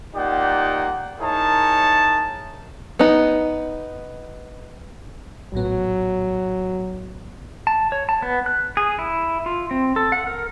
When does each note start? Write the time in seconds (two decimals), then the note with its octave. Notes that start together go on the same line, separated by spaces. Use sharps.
0.15 A#3 D#4 F4 G4 D5 F#5
1.20 D#4 E4 G#4 A#4 C#5 A5
2.99 B3 D#4
5.53 A#1 A2 F#3 B3
7.67 A5
7.92 C#5
8.09 A5
8.22 B3
8.46 F#6
8.77 G#4
8.99 E4
9.46 F4
9.71 C4
9.96 A4
10.12 F#5
10.27 A#4